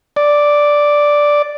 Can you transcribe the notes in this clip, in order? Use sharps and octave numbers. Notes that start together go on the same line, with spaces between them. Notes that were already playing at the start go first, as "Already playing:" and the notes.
D5